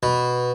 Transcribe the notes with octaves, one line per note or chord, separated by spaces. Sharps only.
B2